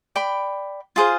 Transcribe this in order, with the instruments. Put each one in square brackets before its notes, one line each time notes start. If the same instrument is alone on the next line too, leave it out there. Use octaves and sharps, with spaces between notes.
[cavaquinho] D5 G5 B5
F4 G#4 C5 F5